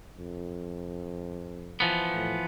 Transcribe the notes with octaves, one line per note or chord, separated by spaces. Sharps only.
F2
E3 F3 B3
A2